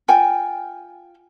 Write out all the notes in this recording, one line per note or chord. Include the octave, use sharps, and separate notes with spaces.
F4 G5 G#5